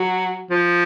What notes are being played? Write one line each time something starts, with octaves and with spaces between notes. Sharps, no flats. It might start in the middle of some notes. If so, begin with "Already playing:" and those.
Already playing: F#3
F3